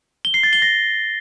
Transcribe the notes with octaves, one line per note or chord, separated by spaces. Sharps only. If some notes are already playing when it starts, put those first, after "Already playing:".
G7
C7
A6
G7
A#6